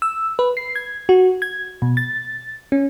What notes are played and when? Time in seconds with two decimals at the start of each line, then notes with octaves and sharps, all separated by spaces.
0.02 E6
0.39 B4
0.57 C7
0.76 G#6
1.09 F#4
1.42 G#6
1.82 B2
1.97 A6
2.72 C#4